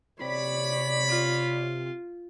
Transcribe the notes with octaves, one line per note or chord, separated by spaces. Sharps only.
C3 C#5 D5 B5
F4